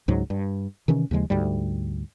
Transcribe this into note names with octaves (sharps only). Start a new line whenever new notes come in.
C#2 G#2 F#3
G2
C3 D#3 E3 C#4
D#2 C#3 F3 G#3
D2 G#2 G3